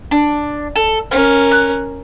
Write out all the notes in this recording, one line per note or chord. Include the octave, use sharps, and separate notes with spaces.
D4
A4
C#4 A#4 F6
F#6